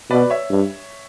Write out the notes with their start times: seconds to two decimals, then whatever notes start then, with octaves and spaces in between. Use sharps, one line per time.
0.10 B2 B4 D5
0.30 C#5 E5
0.50 G2